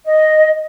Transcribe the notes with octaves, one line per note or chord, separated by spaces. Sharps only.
D#5